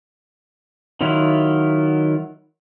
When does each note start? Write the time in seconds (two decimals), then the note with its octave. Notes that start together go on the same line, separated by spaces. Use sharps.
1.01 D#3 F#3 E4 F4